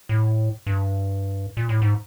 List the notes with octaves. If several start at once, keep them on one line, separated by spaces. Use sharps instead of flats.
A2
G2
A#2
A2
G#2